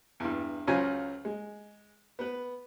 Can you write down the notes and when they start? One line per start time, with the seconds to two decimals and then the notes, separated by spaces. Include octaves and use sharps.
0.20 E2 G2
0.67 C#2 F#3 C#4 F4 C5 G#5
1.25 G#3
2.19 B3 B4